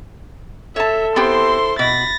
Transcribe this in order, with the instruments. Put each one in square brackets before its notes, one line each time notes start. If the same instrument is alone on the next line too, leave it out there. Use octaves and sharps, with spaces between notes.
[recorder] A4 [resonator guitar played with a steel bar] C#5 A5 [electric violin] E5
[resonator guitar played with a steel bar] B3 C4 G4 [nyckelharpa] E4 C5 [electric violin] C6
[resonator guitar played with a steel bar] B2 [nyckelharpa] B5 [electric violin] A6 A#6